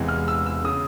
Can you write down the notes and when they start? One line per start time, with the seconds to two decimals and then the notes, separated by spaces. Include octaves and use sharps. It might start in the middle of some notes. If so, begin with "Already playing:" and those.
Already playing: E1 E2 C3 E3 G#3
0.08 F6
0.28 E6
0.46 E6
0.64 C#3 D#6